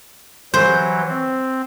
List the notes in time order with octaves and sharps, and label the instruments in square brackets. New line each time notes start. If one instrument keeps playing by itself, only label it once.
[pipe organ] E3 F#3 [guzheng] C5
[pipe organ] C4